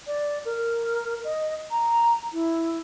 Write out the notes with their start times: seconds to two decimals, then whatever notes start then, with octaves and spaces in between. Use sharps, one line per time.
0.07 D5
0.45 A#4
1.24 D#5
1.71 A#5
2.33 E4